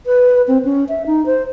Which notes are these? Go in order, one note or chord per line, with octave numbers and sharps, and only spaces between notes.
B4
C4
C#4
E5
D#4
C5